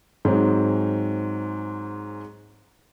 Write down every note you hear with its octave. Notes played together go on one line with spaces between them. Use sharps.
G#2 F#3 G#3 C4